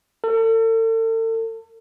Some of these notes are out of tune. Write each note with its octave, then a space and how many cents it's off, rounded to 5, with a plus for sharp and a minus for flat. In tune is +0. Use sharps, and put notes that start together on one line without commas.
A4 +40